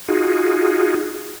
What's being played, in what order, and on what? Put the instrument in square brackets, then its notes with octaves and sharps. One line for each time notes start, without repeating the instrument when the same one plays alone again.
[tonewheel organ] D#4 F4 F#4 G#4